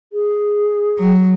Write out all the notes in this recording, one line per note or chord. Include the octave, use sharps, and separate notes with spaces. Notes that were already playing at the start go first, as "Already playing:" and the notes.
G#4
F#3